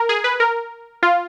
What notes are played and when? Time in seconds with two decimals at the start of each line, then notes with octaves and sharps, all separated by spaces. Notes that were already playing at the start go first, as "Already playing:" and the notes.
Already playing: A#4
0.09 G#4
0.24 B4
0.40 A#4
1.03 F4